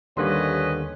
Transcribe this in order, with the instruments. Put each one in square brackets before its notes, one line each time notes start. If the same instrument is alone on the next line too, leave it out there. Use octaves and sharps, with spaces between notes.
[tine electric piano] D#2 D3 A#3 [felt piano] G3 C6 [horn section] C#4 B4 D#5